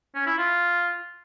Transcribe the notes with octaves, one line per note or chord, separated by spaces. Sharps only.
C#4
E4
F4